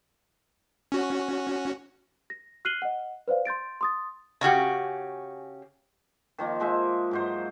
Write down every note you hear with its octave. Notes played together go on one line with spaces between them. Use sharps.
C#4 F#4
A#6
F6 F#6 C7 D#7 F#7 G7
D#5 F#5
B4 C5 D5 F5
C6 G6 A6 D7
C6 D#6 A6
C#3 C#4 F#4 G4
D#3 F3 A#3
F3 G#3 C5 E5
G#2 F#3 C5